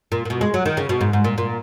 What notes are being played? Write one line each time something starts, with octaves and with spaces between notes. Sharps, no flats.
A#2
A#2
B2
G#3
F#3
D#3
C#3
B2
G#2
G#2
A#2
A#2